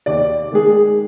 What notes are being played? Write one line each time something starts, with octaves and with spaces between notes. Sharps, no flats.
D#2 D5
D#3 G#3 G#4